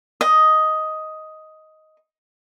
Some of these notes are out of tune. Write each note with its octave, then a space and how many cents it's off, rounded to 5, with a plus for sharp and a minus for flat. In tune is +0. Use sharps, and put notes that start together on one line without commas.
D#5 +10